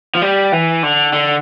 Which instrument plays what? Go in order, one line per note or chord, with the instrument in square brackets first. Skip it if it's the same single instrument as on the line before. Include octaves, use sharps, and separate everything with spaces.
[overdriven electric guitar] F3
G3
E3
D3
D3